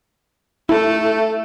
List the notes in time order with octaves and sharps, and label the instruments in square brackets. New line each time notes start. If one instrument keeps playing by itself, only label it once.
[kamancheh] A3 [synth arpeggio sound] E4 [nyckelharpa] A4